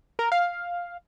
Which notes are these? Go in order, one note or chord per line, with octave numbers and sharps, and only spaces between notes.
A#4
F5